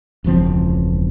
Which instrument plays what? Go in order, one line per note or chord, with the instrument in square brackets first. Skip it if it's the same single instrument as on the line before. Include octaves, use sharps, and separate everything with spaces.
[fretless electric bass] E1 C#2 F3 C4